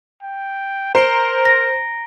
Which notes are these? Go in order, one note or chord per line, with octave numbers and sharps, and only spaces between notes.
G5
A#4 C5 A#5 C7 D7 G7
A#6